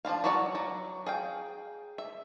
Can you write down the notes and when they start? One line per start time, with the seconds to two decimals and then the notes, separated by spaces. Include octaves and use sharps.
0.05 F3 D4 E4 F5
0.24 F#3 E4 C#5 D5 F#5
0.55 F#3
1.06 G#4 F5 G5
1.98 E5